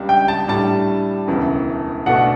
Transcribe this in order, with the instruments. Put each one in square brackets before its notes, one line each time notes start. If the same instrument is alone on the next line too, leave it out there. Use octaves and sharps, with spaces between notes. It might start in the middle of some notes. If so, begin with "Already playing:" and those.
Already playing: [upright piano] C#2 C#3 G3 D4
[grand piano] G5
A5
[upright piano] A2 G3 D4 G4 [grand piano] A5
[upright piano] E1 D2 C#3 E3
[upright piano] B1 B2 A3 D4 A4 [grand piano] F#5